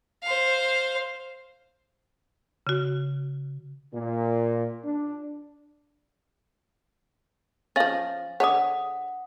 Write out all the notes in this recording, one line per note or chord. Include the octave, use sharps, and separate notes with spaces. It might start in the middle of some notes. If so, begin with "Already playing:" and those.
C5 F5
C#3 F#4
A#2
D4
F3 C#4 F5 A6
D3 G#4 C#5 F#5 D#6